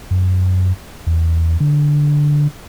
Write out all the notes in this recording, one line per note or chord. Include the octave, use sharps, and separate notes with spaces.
F#2
E2
D3